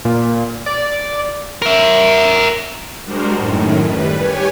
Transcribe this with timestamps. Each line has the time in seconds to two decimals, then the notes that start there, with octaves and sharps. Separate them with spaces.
0.05 A#2
0.66 D5
1.62 A#4 E5
3.05 G3 G#3 D4 F#4 A#4 C5
3.37 F#2 A2 D#3
3.85 G3 B4
4.17 G4 C#5 G#5